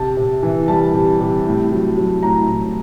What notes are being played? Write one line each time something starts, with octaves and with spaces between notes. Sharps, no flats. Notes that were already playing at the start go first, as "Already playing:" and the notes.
Already playing: C3 A5
C3
E3
G3 A5
C3
C3
A2
F#3
F#3
A2 A#5
A2